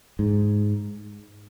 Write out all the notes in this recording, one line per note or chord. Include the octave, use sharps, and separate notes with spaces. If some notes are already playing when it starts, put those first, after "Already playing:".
G#2